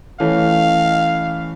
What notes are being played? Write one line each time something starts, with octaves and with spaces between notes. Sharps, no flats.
E3 A3 C#4 F5